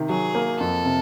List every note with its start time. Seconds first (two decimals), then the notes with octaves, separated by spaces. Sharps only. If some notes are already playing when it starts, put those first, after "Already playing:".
Already playing: C3 D#3
0.09 F#3 G#4
0.35 A#3
0.60 F2 A4
0.85 C3